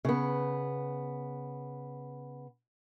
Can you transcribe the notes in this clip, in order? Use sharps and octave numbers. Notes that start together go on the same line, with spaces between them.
C#3 B3